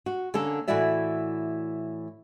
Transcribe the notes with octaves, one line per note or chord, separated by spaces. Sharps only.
F#4
D3 A#3 C#4 A4
A2 E3 E4 F#4 D5 E5